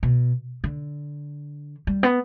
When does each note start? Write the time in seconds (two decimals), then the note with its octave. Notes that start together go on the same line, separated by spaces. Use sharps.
0.03 B2
0.64 D3
1.87 G3
2.03 B3